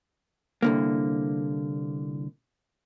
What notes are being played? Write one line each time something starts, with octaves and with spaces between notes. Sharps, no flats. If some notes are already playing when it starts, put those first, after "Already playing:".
C2 D3 A#3